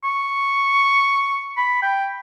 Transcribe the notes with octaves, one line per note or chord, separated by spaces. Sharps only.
C#6
B5
G5